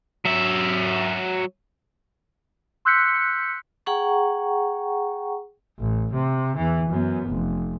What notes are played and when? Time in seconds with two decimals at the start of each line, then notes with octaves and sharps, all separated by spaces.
0.25 F#3 E5
2.85 C6 E6 F#6 G6 B6 C#7
3.86 G#4 F#5 G5 A#5 C#6
5.80 A1
6.13 C3
6.57 E2 E3
6.89 F#2 B3
7.29 F1